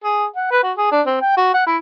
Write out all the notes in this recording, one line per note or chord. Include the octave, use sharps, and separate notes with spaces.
G#4
F#5
B4
F#4
G#4
D4
C4
G5
F#4
F#5
E4